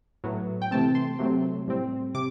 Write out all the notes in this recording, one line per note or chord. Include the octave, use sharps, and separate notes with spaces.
A2 F#3 B3
G5
C3 E3 A3 C4 A5
C6
C3 F#3 A3 C4
A2 G3 C4
C3 D6